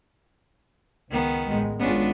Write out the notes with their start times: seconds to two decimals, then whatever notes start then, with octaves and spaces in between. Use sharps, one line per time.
1.11 C#2 D#3 B3
1.46 A1 G#3
1.79 G#1 G#3 B3 C#4 D4 F4